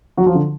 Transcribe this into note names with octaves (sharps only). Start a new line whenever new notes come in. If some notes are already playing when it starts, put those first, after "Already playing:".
F#3 F#4
F3 F4
D3 D4